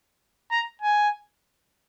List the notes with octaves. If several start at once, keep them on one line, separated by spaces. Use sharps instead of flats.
A#5
G#5